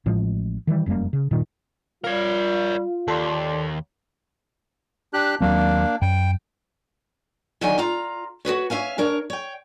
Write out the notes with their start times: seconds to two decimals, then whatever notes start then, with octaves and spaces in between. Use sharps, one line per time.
0.06 A1 A2 F3 G#3
0.67 D#3 E3 G3
0.86 F1 F#2 G3 A#3
1.13 C#3
1.31 D#1 G2 A#2 D#3
2.04 G3 F4 A#4 C#5 F5
3.08 D#2 A4 D5 C6
5.13 D4 G4 F#6
5.41 D#2 F#3 A#3 C4 D4
6.02 F#2 G5
7.61 D3 D#3 F#3 G5 G#5
7.79 F4 A#5
8.45 F#4 G#4 B4 C#5
8.70 C#4 E5 F5 G#5
8.98 D4 A#4 C#5
9.30 C#5 G5